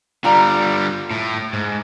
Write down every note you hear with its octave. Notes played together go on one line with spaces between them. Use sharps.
D3 G3 F4 D5 A#5
A2
G#2